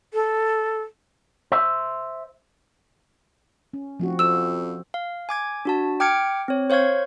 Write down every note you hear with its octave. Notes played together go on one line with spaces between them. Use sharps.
A4
C5 E5
C#4
F1 F3 C4 F#4
F2 C5 E6 E7
F5
G#5 D6 G#6
D4 F#4 A5
G5 D6 F6 G#6 C#7 D7
C4 C#5
C5 C#5 F5 C#6 G#6